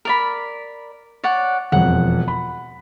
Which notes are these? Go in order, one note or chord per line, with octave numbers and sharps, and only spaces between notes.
A#4 D5 B5
C#5 D5 F#5
E1 F2 F#5
B5